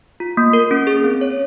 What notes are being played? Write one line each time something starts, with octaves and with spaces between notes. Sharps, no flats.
F4
A#3
A#4
C#4
G#4
C4
C#5